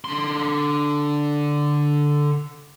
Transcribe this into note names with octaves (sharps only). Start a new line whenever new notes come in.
D3 C6